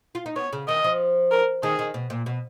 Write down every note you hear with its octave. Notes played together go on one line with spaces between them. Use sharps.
F4
D#4
B3 C#5
C#3
D#3 D#5
F3
A#4
D#3 G#4
D#3
B2
A#2
B2